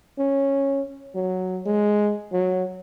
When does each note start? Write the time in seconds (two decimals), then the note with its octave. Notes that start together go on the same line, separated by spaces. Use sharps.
0.19 C#4
1.15 F#3
1.66 G#3
2.32 F#3